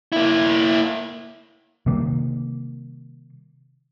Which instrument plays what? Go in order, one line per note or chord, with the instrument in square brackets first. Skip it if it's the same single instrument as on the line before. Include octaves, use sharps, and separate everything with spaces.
[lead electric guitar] A#3 E4
[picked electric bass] C3 D#3 G3 A#3